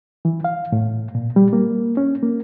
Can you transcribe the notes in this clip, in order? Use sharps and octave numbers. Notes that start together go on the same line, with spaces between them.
E3
F5
A2
A#2
G3
A#3
C#4
A#3